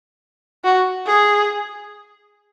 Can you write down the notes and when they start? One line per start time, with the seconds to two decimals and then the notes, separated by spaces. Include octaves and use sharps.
0.64 F#4
1.06 G#4